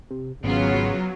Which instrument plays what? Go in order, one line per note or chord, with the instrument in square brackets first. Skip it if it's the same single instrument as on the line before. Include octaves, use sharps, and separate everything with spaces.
[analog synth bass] C3
[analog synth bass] G#1 [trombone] C#3 [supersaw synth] F#3 [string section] B3 C#4 F4